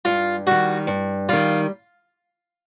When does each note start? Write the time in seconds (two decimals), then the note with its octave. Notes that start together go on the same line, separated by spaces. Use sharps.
0.05 G2 F4
0.46 D#3 G3 F#4
0.87 G2
1.29 D#3 G3 F4